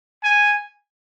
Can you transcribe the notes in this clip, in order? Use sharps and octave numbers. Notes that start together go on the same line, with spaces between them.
G#5